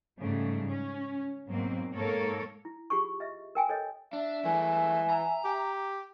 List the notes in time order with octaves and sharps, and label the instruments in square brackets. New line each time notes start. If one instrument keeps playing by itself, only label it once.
[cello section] G#2 C#3 G3 A3
C#4
G#2 B2 F#3 A#3 C4
G#2 A#3 A4 A#4 C#5
[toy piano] E4
F4 G4 G#4 C#6
D#5 E5
A#4 G5 G#5
A4 C#5 D#5
[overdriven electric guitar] D4 [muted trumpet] E5
[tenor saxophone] E3 [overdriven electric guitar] G#3 A3 [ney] G#5
[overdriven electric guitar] A#5
[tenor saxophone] G4